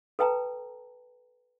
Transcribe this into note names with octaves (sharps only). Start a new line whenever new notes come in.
A4 B4 G5 A5 A#5